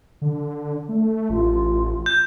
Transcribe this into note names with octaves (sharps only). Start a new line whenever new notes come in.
D3
A3
A1 F4
G6